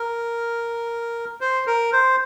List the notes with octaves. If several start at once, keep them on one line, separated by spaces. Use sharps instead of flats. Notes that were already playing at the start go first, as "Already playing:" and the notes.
Already playing: A#4
C5
A#4
C5